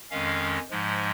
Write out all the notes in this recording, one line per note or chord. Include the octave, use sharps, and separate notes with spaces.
F2 D#3 G#3 C#4 F5
G#2 F3 G#3